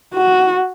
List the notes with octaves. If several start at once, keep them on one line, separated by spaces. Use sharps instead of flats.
F#4